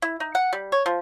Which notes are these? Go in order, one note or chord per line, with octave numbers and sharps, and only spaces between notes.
E4
D#4
F#5
G3
C#5
F3